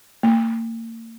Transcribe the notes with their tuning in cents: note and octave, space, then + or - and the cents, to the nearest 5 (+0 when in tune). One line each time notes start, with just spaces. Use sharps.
A#3 -40